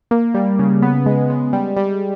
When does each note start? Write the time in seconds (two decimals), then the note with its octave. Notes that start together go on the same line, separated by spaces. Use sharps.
0.11 A#3
0.34 G3
0.59 C#3
0.82 B3
1.06 G#3
1.30 G#3
1.53 G3
1.77 G3